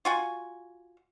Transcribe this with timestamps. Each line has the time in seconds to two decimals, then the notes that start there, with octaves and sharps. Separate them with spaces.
0.05 F4 F#4 G#5